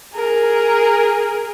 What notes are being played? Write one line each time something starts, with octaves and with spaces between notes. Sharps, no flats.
G#4 A#4